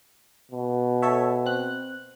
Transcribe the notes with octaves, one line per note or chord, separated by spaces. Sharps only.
B2
A4 C#5 E5
C4 F#6